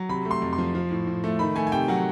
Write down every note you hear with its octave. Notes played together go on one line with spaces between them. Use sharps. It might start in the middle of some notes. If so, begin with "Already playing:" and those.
Already playing: F#3
C3 B5
A3
C6
F2
C6
F3
F3
A2
A2
A3
D#3 B5
A3 G#5
G#5
C3 G5
F#3 F#5